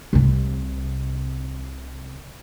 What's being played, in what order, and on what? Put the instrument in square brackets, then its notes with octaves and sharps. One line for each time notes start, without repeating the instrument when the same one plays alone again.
[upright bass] C2 C3